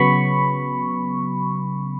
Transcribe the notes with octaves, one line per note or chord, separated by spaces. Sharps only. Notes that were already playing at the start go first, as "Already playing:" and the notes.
Already playing: C#3 F#3 B3 B5 C#6